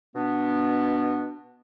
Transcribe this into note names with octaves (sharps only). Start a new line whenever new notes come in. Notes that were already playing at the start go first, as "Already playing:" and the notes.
B2 B3 D4